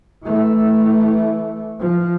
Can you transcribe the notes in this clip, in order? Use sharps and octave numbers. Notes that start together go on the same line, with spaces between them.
E3 A3
F3